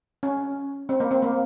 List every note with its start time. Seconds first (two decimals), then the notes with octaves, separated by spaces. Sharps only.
0.23 C#4
0.89 C4
1.00 A#3
1.11 C4
1.22 A#3